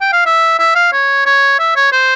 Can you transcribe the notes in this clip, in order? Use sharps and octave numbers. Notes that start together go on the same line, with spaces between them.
G5
F5
E5
E5
F5
C#5
C#5
E5
C#5
C5